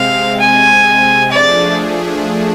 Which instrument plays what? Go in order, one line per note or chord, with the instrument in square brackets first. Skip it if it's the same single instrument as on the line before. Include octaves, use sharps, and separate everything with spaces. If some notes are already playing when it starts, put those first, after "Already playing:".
Already playing: [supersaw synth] C3 G#3 C4 [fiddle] F5
[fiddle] G#5
[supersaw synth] F3 A3 D4 G#4 [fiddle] D5